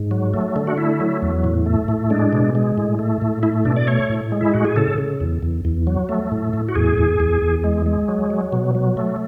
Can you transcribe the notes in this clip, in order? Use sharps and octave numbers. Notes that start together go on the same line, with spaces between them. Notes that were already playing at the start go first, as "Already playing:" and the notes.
Already playing: G#2
F#3
A3
D3
F#4
A3 E4
F#3
E2
A2
A3
A2
G#3 D4
B2
G#3
A2
A3
A2
A3 E4
B2 D4
D5
A3 C#5
A2
G#3
E4
A2 F#4
G#4
C#3 A4
C#3
E2
E2
E2
F#3
A3
A2
A2
F#4
E2 G#4
E2
E2
E2
G#3
G#3
F#3
F#3
B2
F#3
A3